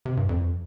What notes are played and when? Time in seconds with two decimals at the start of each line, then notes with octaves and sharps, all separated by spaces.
0.06 C3
0.17 G2
0.29 F2